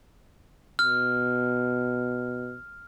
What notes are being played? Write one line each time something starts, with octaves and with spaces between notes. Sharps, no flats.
B2 F6